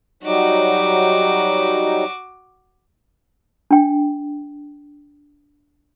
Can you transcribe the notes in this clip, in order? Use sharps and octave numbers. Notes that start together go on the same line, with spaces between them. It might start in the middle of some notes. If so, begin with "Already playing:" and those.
F#3 G3 D#4 F#4 D6
D4 G5